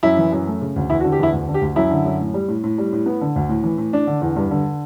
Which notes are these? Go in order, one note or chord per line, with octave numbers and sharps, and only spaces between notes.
F#2 E4
E3
F#2
A3
C#3
D2
E2 E4
F#4
D3
G4
E2 E4
D2
D3
G4
D2
F#2 E4
D3
F#2
A2
G3
A2
A2
G3
A2
B3
D3
D2
A2
E3
A2
D4
D3
E2
G2
D3